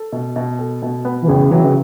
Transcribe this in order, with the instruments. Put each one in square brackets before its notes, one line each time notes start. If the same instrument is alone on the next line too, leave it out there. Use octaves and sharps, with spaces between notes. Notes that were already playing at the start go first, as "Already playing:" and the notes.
Already playing: [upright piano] A4
B2
B2
A4
B2
B3
[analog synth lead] E3
[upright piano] A1 [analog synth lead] C#3
[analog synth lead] E3 [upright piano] F#3
[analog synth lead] C#3